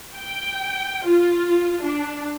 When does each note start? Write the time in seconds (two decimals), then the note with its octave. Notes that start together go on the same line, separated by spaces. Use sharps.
0.15 G5
1.05 F4
1.82 D4